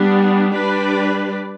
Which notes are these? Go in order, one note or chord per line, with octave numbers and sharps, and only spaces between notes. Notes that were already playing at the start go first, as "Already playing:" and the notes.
Already playing: G3 B3 D4
G3 D4 G4 B4 D5